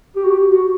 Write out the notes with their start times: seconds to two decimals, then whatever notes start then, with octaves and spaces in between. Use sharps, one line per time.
0.16 G4
0.24 F#4
0.31 G4
0.50 F#4